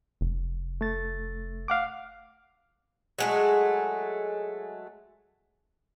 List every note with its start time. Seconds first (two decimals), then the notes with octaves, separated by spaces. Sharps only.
0.21 F1
0.81 A3 A6
1.68 F5 F#5 D6
3.19 F#3 G#3 A3